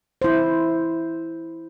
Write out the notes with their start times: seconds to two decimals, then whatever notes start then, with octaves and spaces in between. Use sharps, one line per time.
0.22 E4 C5